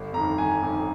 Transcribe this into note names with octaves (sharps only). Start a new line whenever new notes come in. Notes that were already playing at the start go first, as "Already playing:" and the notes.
Already playing: G1
F2 D#3 A#5
G1 G#5
F2 D#3